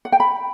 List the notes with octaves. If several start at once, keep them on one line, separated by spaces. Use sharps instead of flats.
F#5
G5
B5